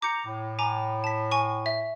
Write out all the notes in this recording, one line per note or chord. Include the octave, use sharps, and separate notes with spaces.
A#5 D6 G6 C#7
A2
G#5 A#5 D6
A5 B6
G#5 C#6
E5